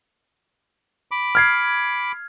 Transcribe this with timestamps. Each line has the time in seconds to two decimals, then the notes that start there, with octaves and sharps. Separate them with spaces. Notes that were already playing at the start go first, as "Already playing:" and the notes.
1.11 B5 D6
1.35 F6 G#6 C7